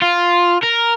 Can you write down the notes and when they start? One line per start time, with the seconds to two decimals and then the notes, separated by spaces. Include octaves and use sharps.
0.02 F4
0.63 A#4